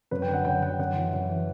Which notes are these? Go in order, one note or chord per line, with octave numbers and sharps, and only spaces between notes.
F#2 B4
G5
D3
F#5
F#2 G5
D3 F#5
F#2 F#5
E3
F#2
E3